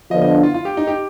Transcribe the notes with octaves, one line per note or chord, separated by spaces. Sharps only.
D3 F3 B3 D4 F4 D#5
D#5
F4
F4
G4
D#4
G4